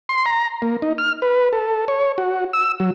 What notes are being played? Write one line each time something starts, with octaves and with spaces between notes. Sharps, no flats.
C6
A#5
A#3
D#4
F6
B4
A4
C#5
F#4
E6
F#3